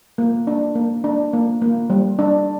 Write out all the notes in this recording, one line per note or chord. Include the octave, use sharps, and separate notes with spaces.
A#3
D4
A#3
D4
A#3
A#3
G3
D4